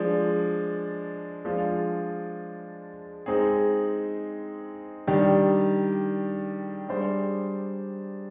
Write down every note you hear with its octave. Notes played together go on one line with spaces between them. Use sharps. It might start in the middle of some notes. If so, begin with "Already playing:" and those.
Already playing: F3 G#3 D4
F3 G#3 D4 F4
G#3 C4 D#4 G#4
D#3 G3 D4 G4
G3 D4 G#4 C5